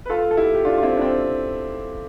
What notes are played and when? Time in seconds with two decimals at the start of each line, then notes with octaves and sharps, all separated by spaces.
0.06 B4
0.10 F4 A4
0.31 A4
0.37 E4 G4
0.55 G4
0.65 D4 F4
0.78 F4
0.83 C4 E4
0.97 D4
1.01 C4